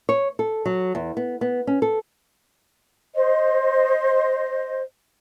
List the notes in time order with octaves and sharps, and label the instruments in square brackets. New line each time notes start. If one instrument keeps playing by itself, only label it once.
[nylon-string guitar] C#5
A4
F#3
E2
B3
B3
C#4
A4
[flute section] C5 D#5